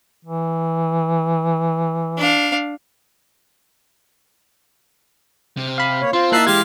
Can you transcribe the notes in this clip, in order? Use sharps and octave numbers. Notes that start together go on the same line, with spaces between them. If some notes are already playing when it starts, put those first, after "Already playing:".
E3
D4 F5
C3 F6
F5 B5
A#3 C#5
C4 F4 C6
A#3 D#4 E4 E5 A5 F#6 C7
E3 G#3 G4 F5 C6 G#6